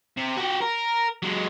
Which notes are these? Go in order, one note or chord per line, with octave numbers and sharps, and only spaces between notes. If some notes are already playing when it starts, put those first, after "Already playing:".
C3
F#4 G4
A#4
F#3 G#3